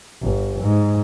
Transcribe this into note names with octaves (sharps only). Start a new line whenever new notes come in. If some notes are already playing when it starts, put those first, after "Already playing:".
G1
G#2